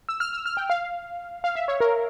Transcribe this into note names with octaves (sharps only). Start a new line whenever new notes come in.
E6
F6
E6
F6
G5
F5
F5
E5
C#5
A#4